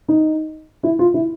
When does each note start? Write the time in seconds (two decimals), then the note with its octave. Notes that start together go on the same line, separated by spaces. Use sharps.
0.08 D#4
0.83 E4
0.99 F4
1.14 E4